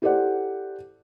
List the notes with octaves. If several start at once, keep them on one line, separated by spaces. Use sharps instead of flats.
E4 G4 A4 C5 D5 F#5